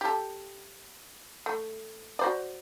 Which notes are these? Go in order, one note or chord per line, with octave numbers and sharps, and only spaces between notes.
G4 A4
A3
F#4 C5 D5